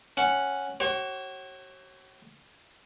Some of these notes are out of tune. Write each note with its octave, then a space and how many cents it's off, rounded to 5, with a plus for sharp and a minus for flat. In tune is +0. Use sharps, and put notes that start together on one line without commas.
C#4 +0 F#5 +0
F#4 +40 C#5 -35